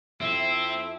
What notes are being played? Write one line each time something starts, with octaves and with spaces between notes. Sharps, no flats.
F2 C4 E4 E5